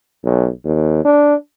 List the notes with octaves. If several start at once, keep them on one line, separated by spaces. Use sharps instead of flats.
B1
D#2
D4